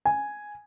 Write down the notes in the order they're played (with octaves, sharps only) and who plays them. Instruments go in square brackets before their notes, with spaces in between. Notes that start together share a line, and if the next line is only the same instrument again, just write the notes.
[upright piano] G#5